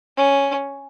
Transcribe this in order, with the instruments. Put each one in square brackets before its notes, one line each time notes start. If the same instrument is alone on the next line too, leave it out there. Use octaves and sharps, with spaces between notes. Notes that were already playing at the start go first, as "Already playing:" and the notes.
[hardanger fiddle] C#4